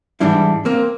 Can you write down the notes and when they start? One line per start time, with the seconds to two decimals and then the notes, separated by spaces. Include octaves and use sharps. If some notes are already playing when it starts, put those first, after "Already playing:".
0.20 G#2 E3 G3 D4 E4
0.65 A#3 C4